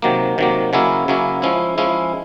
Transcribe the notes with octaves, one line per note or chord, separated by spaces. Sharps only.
C3 D#3 F#3 A#3
C3 D#3 F#3 A#3
C#3 F#3 A#3 C#4 E4
C#3 F#3 A#3 C#4 E4
F3 G#3 C#4 E4
F3 G#3 C#4 E4